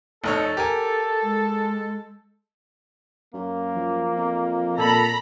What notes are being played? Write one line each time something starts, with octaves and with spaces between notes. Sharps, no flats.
F1 D#4 A4 C#5
G4 A#4 G#5
G#3
F#2 A#3
F3
F2
A#2 A4 A#5 B5